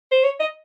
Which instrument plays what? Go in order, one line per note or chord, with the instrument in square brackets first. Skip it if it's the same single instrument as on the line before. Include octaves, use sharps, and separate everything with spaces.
[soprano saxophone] C5
C#5
D#5